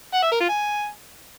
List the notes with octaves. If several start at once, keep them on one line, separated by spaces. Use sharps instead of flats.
F#5
E5
A#4
F4
G#5